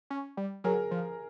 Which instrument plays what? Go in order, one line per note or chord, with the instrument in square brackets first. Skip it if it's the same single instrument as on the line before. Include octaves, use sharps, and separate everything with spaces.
[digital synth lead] C#4
G3
[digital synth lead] F#3 [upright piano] G#4 A#4
[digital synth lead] F3